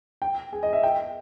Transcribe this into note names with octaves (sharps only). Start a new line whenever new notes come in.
G5
G#4
D#5
E5
G5